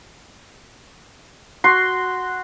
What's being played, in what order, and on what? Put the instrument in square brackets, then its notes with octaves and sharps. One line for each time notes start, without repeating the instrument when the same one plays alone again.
[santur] F#4 C6